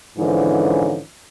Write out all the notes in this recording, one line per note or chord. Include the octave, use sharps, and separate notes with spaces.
G#2 D3 E3 F3 C#4 D#4